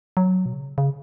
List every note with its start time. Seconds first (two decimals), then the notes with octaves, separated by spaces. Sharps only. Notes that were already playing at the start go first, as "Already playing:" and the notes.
0.17 F#3
0.46 B2
0.53 C#3
0.78 C#3